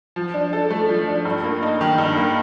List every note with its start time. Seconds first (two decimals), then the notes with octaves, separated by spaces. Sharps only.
0.16 F3
0.34 D4
0.53 A4
0.71 A3
0.89 F3
1.08 D4
1.25 G2
1.44 A#3
1.62 D#4
1.81 D#3
1.98 G2
2.17 A#3